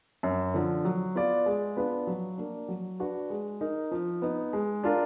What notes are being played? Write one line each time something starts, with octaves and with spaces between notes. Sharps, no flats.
F#2
D3 F3
F#3
B3 F4 B4 D5
G#3
B3 D4 F4 B4
F#3
A#3 D4
F#3
D4 F#4 B4 D5
G#3
D#4 A#4
F3
B3 D#4
G#3
D4 F4 A#4